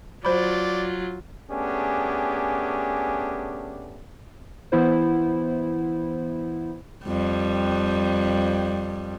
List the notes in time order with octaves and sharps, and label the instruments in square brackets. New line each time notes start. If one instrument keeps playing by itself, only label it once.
[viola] F#3 F4 [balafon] C5 B5 [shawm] D5
[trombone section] A3 B3 C#4 D4 G4 G#4
[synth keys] E3 B3 E4 C5
[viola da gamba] F2 G3